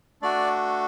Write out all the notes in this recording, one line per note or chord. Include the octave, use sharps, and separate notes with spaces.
A3 D4 F#4 D5